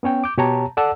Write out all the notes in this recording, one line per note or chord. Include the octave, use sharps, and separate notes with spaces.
B3 C#4 C#5 G5
D6 G6
B2 G4 C#5 A5 A#5
A4 D5 F#5 A5 E6